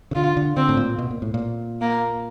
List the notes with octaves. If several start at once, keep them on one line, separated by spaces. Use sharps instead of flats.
C#3
D3 F4
D3
D3 C4
A2
A#2
B2
A#2
A2
A#2
A#3